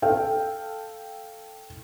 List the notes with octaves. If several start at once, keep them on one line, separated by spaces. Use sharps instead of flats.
A4 F5 G5